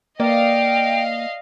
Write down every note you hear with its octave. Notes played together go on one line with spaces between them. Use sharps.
A#3 D5 D#5 F5 G5